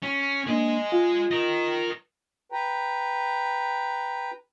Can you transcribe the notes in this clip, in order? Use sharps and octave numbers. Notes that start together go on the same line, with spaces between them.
C#4
A#3 D4 G#4 D#5
F4
A#4 D#5
B4 G5 A#5